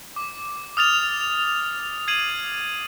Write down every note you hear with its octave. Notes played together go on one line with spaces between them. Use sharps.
D6
D#6 F6 A6 F7
G#6 C7 D#7 F#7